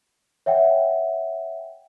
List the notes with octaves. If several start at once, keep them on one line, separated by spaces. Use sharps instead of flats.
C#5 E5 F#5 G5